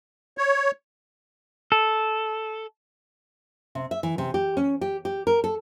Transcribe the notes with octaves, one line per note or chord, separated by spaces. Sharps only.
C#5
A4
C3
E5
E3
C3
G4
C#4
G4
G4
A#4
A4